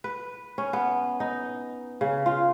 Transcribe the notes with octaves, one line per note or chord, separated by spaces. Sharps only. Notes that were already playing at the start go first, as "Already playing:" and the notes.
B4
C#4
B3
D#4
C#3
F4